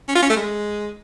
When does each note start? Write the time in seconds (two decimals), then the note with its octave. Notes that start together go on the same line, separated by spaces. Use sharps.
0.08 C#4
0.15 F4
0.23 C#4
0.30 A3
0.37 G#3